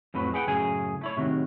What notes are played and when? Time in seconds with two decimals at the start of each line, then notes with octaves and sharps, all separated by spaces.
0.14 F2 A2 F#3 B4
0.34 G#4 B4 F#5 G5
0.47 F#2 A2 C#3 G#4 G#5
1.01 A3 E4 C#5
1.16 A2 C3 D#3 F#3